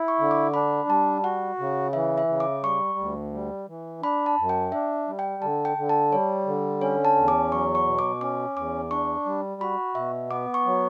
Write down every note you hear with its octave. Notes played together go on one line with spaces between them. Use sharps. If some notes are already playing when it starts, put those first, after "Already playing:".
Already playing: E4
C#6
D3
D6
D4 B5
G3 A5
F#4 F#5
C#3
E3 E5
E5
C#3
D6
G3 C#6
D2
G3
E3
D4 B5
A5
F#2
G5
D4 E5
G3
G5
D3 A5
G5
D3
A5
G3 C#5
D3
C#4 C#5
A5
E2
D6
F#3 C#6
C#6
B2
D6
C#4 D6
E2 D6
D4 C#6
G3
F#4 B5
B2 E5
B3 D6
C#6
F#3